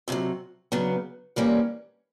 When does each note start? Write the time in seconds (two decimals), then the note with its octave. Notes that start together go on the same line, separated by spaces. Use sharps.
0.08 F2 C3 D#3 F#3
0.72 C#3 F#3 B3 D4
1.36 G2 E3 G3 A#3 C#4